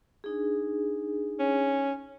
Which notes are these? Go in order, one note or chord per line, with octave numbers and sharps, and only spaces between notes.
D4 D#4 G#4
C#4